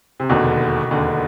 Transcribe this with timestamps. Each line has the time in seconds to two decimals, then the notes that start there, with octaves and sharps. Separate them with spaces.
0.20 C3
0.29 E1 D#2 B2 D3
0.91 E1 D#2 D3